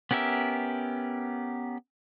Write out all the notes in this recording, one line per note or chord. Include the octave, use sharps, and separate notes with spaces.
B3 C#4 G4 A#4 E5